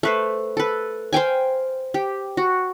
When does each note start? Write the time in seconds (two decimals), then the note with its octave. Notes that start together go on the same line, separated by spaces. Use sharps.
0.03 A3 B4 C5
0.57 A4 B4
1.13 C5 F5 G5 G#5
1.94 G4
2.37 F#4